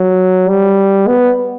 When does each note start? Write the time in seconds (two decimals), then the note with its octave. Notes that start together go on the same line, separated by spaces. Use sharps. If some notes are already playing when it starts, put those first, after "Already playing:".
Already playing: F#3
0.49 G3
1.08 B3